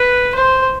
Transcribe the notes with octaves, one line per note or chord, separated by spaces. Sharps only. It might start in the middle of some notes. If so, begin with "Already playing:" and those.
Already playing: B4
C5